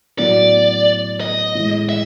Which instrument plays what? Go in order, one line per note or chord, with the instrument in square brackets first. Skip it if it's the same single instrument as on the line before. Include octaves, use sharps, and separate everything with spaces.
[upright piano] A2 F#3 B3 [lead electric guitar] D5
[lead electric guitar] D#5
[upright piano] A2 E3 G#3
[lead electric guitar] E5